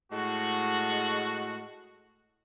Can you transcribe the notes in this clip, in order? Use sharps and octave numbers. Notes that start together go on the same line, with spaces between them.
A2 G#3 F#4